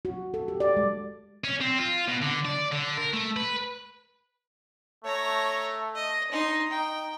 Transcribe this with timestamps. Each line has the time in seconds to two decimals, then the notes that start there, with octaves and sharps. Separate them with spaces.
0.05 F#4
0.34 A4
0.48 G4
0.60 D5
0.77 G#3
1.44 C#4
1.61 C4
1.79 F4
2.08 B2
2.22 D3
2.45 D5
2.72 D3
2.97 A#4
3.13 A3
3.37 B4
5.04 A3 C#5 A#5
5.95 D#5
6.31 D#4 C6
6.70 D#4 G5